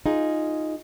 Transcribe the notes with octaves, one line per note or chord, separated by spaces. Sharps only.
D#4 F4 G#4